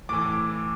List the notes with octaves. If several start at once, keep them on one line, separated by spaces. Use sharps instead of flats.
A2 E3 D6